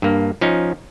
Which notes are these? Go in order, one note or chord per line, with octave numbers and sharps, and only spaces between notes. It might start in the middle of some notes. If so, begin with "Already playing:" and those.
G2 A#3
F3 C#4 D#4